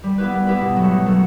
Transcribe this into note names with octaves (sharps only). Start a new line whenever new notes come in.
G3
B3 E4 G4 B4
G3
B3 E4 G4 B4
B2
F#3 A3
B2
F#3 A3